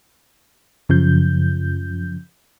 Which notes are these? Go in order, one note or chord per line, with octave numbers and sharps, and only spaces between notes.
F#2 C#3 F3 G6